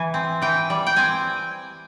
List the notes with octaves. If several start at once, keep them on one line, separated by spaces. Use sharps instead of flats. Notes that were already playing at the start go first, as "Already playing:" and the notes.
Already playing: E3 G#5
C4
E3 G5
G3
G5
C4 G#5